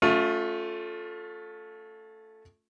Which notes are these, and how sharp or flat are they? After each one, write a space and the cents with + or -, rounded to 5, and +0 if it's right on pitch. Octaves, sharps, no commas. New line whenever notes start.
A3 +0 C#4 +10 F4 +30